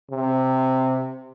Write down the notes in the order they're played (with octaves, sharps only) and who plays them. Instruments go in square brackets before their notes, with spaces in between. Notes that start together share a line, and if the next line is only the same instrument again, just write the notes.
[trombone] C3